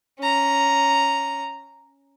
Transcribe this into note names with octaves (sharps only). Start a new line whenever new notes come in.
C#4 A#5